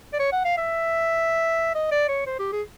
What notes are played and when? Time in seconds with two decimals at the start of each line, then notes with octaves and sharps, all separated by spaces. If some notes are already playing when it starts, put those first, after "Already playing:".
0.13 D5
0.20 C#5
0.32 F#5
0.45 F5
0.58 E5
1.75 D#5
1.92 D5
2.09 C#5
2.27 C5
2.39 G4
2.52 G#4